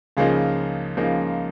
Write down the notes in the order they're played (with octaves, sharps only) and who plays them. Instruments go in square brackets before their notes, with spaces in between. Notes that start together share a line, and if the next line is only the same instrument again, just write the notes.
[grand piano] C#2 C#3 F3 A#3 D#4
C#2 C#3 F3 A#3 D#4